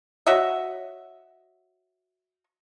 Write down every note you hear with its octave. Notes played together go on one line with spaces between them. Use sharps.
F#4 C#5 D#5 E5